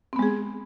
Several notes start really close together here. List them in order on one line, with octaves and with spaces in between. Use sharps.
C4 B3 G#3 G#4